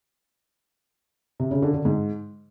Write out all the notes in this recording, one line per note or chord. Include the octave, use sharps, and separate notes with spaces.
C3
C#3
D3
D3
G#2